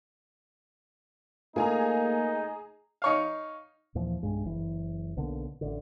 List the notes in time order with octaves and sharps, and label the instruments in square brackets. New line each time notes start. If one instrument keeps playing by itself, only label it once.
[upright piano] A3 F4 A#4 [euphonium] A#3 [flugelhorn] D#4 [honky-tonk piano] G#4 G#5 A#5
[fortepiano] D#4 C#5 F5
[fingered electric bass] D#2 A#2 E3 F3
B1 G2 G#3
F#1 E3
B1 B2 D3 A#3
A1 D3